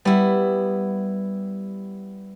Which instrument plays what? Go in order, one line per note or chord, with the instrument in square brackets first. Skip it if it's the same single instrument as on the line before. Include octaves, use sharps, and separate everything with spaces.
[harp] G3 [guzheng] B3 E4